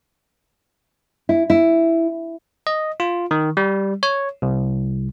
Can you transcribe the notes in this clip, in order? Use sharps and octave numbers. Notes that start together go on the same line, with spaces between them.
E4
E4
D#5
F4
D#3
G3
C#5
C2